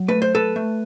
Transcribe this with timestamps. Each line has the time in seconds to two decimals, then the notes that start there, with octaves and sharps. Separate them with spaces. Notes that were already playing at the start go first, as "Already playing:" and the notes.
Already playing: F#3
0.08 A3 B4
0.22 C5
0.35 A4 B4
0.56 A3